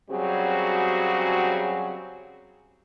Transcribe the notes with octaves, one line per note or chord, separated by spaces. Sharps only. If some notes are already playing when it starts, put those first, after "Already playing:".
C#3 F#3 G3 C4 F#4 G#4